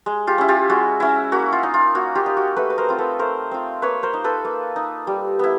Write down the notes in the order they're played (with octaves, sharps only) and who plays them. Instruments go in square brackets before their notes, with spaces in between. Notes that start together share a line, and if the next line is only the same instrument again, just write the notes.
[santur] G#3
F4 G4
C#4 E4
F4 G4
G#3 F#4
C#4 E4
A#3 F#4
F4
D#4
F4
A#3 F#4
F4 G4
D#4
F#4
A3 A4 B4
B4
A#4 C5
C4 F4
A4 B4
A3 A#4 C5
C4 F4
A#3 B4 C#5
A#4 C5
D#4
A4 B4
A#3
D#4
G3
B3 E4